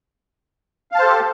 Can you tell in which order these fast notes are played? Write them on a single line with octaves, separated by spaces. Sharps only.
F5 A5 C5 A4 G4